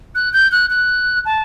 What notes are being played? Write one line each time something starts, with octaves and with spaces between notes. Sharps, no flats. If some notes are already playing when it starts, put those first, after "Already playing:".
F#6
G6
F#6
F#6
A5